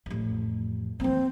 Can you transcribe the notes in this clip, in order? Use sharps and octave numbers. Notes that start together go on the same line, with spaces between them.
A1 F2
E3 A#3 C4